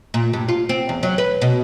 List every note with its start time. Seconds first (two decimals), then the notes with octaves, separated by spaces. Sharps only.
0.14 A#2
0.33 G2
0.49 F4
0.69 C4
0.89 E2
1.03 F#3
1.18 B4
1.42 B2